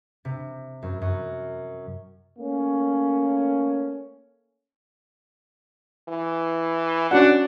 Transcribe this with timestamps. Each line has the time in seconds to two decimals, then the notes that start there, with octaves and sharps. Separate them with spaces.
0.25 C3
0.83 F#2
1.02 F#2
2.39 A3 A#3 C#4
6.09 E3
7.11 C#4 D4 F#4 F#5